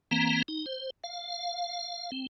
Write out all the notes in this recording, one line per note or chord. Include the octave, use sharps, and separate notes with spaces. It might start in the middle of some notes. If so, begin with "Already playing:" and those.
E3 A#3 C4 A#5
D#4
C5
F5
C4